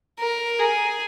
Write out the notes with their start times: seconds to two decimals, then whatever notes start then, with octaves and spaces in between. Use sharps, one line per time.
0.19 A#4
0.59 G#4